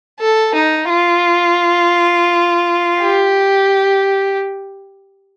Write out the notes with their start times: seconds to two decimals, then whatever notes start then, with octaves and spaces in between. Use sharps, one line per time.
0.20 A4
0.55 D#4
0.90 F4
3.01 G4